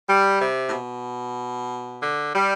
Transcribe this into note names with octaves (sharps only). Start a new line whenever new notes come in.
G3
C3
A2
B2
D3
G3